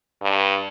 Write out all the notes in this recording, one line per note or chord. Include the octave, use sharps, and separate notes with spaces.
G2